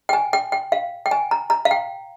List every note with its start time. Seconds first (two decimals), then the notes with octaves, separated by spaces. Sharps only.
0.09 G5
0.13 G#5
0.33 G5
0.52 G5
0.72 F5
1.06 G5
1.11 G#5
1.31 A#5
1.50 A#5
1.65 F5
1.71 G5